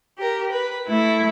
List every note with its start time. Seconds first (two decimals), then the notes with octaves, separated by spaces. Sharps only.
0.17 G4 A#4
0.51 B4
0.87 A3 E4